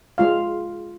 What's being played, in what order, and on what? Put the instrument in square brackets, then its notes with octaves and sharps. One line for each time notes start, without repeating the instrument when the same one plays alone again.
[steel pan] G#3 F4 F5